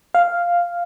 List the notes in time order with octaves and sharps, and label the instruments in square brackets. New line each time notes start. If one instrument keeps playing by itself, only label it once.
[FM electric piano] F5